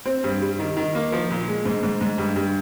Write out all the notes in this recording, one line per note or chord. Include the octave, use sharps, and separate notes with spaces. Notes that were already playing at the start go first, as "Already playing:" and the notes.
C4
G2
G3
D#3
D#3
A#3
F3
A#2
G#3
G#2
G#2
G#2
G2
G2